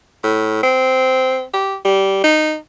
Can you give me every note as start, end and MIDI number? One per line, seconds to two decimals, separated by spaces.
0.23 0.58 45
0.63 1.44 60
1.53 1.76 67
1.85 2.20 55
2.24 2.55 63